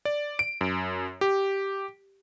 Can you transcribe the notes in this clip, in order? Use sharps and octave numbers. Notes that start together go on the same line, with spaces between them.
D5
D7
F#2
G4